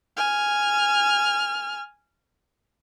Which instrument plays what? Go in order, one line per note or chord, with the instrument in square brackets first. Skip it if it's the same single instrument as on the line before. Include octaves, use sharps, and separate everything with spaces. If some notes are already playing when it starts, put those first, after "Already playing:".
[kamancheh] G#5 F6